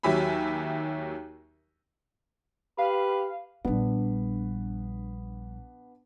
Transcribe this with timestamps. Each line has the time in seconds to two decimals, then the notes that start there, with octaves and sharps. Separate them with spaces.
0.03 D#2 F#3 G4 E5 G#5 B5
2.78 G4 B4 F5
3.65 A#1 G3 B3 D4